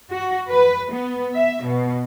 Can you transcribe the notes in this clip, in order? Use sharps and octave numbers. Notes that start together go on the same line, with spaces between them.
F#4
B4
B3
E5
B2